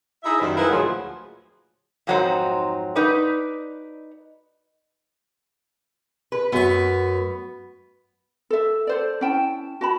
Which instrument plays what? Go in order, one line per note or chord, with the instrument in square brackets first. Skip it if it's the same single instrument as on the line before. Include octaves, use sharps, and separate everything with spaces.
[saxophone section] D#4 E4 G#4 E5
F#2 D#3 G3 C5
D#4 E4 G#4 A#4 B4 F5
D2 A#2 F3 F#3 G#4 F#5
[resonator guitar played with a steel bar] F2 G#2 F#3 D#4 C5
D#4 B4 D5
B4
[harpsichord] F#2 C#6 [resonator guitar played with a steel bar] B3
[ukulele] A4 E5
A4 C5 D5
C#4 E4 G5 A5
F#4 A5 B5